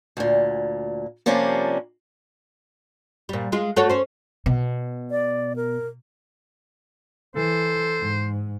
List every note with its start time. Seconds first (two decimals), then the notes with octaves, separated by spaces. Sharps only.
0.17 D2 A#2
1.26 C3 F3 G3 A#3 C#4 D4
3.29 A#2 G3
3.52 G#3 F4
3.76 A3 F#4 C#5
3.90 C#4 C5
4.46 B2
5.11 D5
5.56 A#4
7.36 E3 A4 C5
8.00 G#2